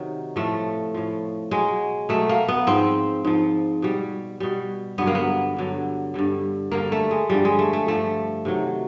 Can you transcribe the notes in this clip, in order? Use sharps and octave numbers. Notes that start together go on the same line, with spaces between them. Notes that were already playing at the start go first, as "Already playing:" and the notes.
Already playing: C3 D#3 F#3
A2 F3 A3
A2 F3
B2 F#3 G#3
B2 F#3 A3
A#3
B3
G#2 F3 C4
G#2 F3
B2 G3
B2 G3
G2 D3 F#3 B3
A#3
B3
G2 D3 F#3
G2 D3 G3
G2 D3 G3 A#3
A3
G#3
G2 D3 F3 G3
G#3
A3
A3
G2 D3 F3 A3
C3 D#3 F#3